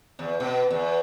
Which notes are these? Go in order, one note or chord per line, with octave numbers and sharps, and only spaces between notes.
E2
B2
E2